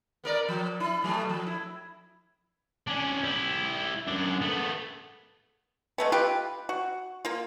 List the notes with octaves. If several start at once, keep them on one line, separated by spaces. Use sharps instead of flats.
B3 A#4 D5
F3
E4
B2 F#3 A3
F3
E4
C#4 D4
E4 G4
F#2 D4
A3 B3
G#3 A3 B3
F4 G4 B4
F#4
A#3 F4